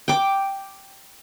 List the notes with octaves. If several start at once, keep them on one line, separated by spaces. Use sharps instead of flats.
G5 D6